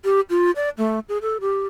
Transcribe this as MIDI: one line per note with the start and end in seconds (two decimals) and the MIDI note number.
0.05 0.20 67
0.30 0.51 65
0.56 0.70 74
0.78 0.99 57
1.09 1.18 68
1.22 1.38 69
1.41 1.67 67